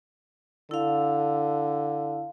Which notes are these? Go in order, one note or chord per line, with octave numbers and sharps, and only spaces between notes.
D3 E4 F5